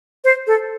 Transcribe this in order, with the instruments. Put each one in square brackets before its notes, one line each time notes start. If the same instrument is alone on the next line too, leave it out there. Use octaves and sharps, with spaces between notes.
[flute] C5
A4